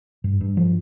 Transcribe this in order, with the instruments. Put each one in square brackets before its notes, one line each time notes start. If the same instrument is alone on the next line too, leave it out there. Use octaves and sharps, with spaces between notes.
[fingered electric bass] G2
G2
F3